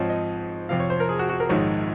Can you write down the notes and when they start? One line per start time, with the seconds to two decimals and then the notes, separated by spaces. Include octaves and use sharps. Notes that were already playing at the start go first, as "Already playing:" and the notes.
Already playing: G#2 F3 C4 D#4 C#5
0.10 D#5
0.69 F2 C3 F3 F5
0.80 C#5
0.90 C5
1.00 A#4
1.09 G#4
1.19 F#4
1.29 F#4
1.40 A#4
1.49 A#1 G#2 D#3 G#3 C#5